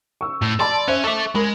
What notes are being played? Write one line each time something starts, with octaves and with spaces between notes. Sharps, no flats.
C#6 E6
A2 E6
D5 A5 B5 C6
C#4 C5 E5 F#6
A4 E5 C#6 D6
G#3 A#4 B5